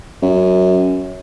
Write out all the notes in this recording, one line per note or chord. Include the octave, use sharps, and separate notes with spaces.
F#2